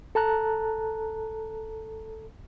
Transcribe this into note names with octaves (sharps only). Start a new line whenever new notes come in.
A4 A5 A#5 F#6